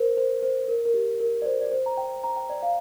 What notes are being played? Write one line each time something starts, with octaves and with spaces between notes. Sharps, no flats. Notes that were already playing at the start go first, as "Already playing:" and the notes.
Already playing: A#4 C5
C5
C5
A#4
A#4
G4
A#4
D5
C5
D5
C5
A#5
G5
A#5
G5
D5
F5